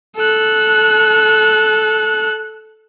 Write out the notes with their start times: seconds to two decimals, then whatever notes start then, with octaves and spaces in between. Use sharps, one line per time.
0.17 A4 F#6